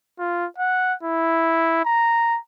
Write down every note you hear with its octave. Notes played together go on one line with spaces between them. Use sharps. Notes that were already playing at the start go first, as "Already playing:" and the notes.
F4
F#5
E4
A#5